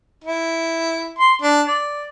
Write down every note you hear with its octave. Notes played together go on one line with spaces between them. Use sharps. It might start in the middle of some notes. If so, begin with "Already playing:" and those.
E4
C6
D4
D5